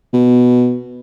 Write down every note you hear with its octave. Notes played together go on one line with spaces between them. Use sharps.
B2